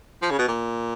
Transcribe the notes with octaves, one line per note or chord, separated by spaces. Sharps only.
F3
C#3
B2
A#2